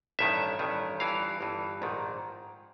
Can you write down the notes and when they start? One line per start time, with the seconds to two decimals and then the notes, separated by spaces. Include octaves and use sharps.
0.19 A1 G2 D#3 E5
0.59 A1 G2 D#3
1.00 G1 G2 E3 F5
1.41 G1 G2 E3
1.82 A#1 G#2 D#3